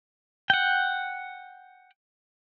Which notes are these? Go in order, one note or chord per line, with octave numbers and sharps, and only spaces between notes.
F#5 G5